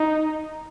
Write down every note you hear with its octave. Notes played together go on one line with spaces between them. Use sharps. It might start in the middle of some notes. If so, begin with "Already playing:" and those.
Already playing: D#4